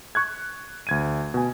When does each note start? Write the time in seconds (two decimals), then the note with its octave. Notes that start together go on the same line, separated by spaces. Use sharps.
0.15 C#6 F#6 G#6
0.87 D2 G#6 D#7
1.34 B2 G#5